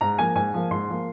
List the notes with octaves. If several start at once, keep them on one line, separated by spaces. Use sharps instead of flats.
G#2 A#5
F3 A#3 G#5
G#2 G#5
F3 A#3
G#2 C6
F3 A#3